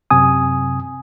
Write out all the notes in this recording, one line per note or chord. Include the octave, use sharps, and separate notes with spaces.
F#2 C3 G#5 D#6